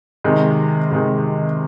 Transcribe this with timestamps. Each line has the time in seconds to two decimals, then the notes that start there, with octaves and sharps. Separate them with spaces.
0.24 C3 D#3 G#3
0.91 C3 D#3 G#3